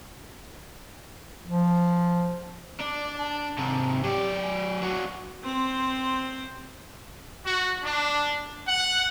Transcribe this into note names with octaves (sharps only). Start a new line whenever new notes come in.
F3
D4 D5
A5
G#2 C3
F#3 G4 D5
G#5
F#3 D4 F#4
C4 C5
F#4
D4
F#5